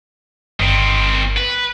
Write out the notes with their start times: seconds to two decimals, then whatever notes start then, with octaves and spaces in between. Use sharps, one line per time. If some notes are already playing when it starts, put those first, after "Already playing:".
0.60 G1 D#3 C4
1.37 B4